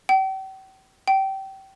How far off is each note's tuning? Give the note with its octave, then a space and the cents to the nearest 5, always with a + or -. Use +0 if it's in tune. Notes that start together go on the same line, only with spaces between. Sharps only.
G5 -40
G5 -25